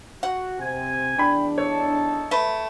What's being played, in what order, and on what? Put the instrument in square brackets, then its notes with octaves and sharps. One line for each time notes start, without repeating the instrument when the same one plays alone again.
[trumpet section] F#4 [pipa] F#5
[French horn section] C3 [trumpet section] G#5
[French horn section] E2 D4 [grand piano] G5 B5
[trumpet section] D#4 A4 A5 [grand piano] C#5
[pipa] A3 B4